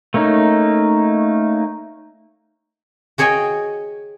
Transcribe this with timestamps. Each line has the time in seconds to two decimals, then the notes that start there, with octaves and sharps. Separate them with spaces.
0.14 A3 A#3 C#4 D#4
3.18 F#4 G#4 C#5 D#5 G5 G#5